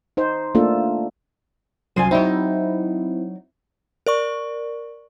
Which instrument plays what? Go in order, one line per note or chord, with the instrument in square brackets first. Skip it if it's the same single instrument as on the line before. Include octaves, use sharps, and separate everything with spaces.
[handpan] D#4 C5
A3 A#3 D4 F4 A4
[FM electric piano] C2 F#2 C6 [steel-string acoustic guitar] F3 F4 G#5
[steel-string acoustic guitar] F#3 D#4 [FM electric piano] C4 E4
[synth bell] A#4 D5 C#6